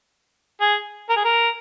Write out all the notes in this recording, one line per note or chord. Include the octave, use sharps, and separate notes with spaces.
G#4
A#4
G#4
A#4